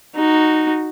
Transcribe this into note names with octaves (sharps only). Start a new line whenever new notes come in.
D#4 F#4